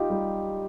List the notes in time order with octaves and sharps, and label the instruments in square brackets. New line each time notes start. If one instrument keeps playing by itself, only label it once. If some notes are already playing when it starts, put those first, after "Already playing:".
Already playing: [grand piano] D#4 F4 G4
G3